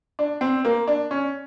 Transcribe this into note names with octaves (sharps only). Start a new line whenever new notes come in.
D4
C4
A#3
D4
C#4